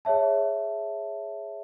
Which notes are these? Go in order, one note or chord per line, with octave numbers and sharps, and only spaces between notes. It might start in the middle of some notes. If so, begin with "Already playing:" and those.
G#4 C#5 E5 A5